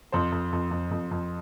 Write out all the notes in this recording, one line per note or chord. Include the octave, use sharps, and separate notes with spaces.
F2 C5
F2
F2
F2
F2
F2